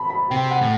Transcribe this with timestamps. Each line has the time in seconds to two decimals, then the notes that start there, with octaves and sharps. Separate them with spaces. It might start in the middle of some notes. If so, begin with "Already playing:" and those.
Already playing: A5 B5
0.10 B5
0.30 C3 G5
0.51 F#5
0.61 A2